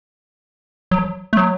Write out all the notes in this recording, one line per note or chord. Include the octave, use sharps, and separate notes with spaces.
F#3
A3
F#3